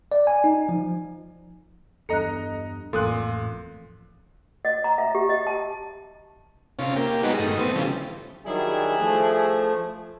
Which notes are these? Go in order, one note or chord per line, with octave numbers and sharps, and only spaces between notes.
D5
G#5
D#4
F3
E2 G2 A4 D#5 A#5 F#6 C#7
A1 F2 A#2 A4 F5 C6 D#6 F#6
D#5
A#5
E5
G4
D#5
A5
C3 C#4 F4
A#3 G4
G3 G#3 B3 D#4 F#4
G2 D#3 A3 D#6
A3 B3 C4
C#3 E3 F3 G3
D#3 F#3 G3 D4 E4 G#4
F3 A3